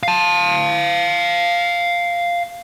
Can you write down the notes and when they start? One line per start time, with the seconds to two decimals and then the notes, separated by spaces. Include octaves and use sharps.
0.03 F5 A5